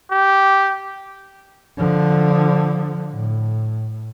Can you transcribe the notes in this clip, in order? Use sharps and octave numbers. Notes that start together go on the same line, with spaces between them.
G4
D3 F3
A2